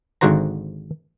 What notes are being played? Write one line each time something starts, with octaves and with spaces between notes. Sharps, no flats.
G#1 G#2 D3 F#4 C5 A#5